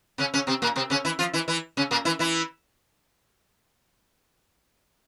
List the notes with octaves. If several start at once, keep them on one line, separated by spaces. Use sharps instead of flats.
C#3 C#4
C#3 C#4
C3 C4
A#2 A#3
C3 C4
C#3 C#4
E3 E4
F3 F4
E3 E4
E3 E4
C#3 C#4
A#2 A#3
E3 E4
E3 E4